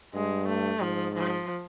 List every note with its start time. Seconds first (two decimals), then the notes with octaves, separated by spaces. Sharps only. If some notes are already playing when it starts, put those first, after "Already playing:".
0.14 G2 G#3
0.48 A3
0.81 G#2 F3
1.15 F3